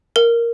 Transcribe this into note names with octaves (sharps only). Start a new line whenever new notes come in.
A#4